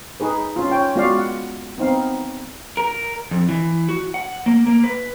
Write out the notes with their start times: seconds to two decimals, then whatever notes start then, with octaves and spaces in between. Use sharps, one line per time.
0.20 D#4 G#4 B4
0.56 C#4 F4
0.71 C#5 G5
0.96 G#3 B3 F4 F#4 D5 F5
1.18 F#5
1.78 B3 C4 D#4 F5
2.77 A#4
3.31 F2
3.49 E3
3.89 F#4
4.14 F#5
4.46 A#3
4.67 A#3
4.83 B4